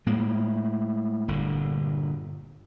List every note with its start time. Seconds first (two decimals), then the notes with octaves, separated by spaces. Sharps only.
0.06 A2 G#3 A#3
1.28 G1 A#2 D3